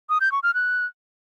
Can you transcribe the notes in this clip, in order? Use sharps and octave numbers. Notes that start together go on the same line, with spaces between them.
D#6
G6
C#6
F6
F#6